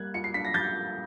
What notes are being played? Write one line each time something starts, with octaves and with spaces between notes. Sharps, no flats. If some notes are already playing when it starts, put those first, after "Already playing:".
Already playing: G3 A#3 F#6 G#6
F4 C#7
C7
D4 B6
A#6
G3 G6 A6
A#3